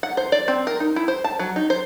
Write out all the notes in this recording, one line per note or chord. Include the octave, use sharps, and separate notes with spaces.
F#5
C5
D5
C4
A#4
D#4
E4
C5
A5
F#3
D#4
C5